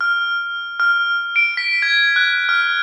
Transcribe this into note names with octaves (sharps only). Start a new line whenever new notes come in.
F6
F6
D7
B6
G#6
F#6
F6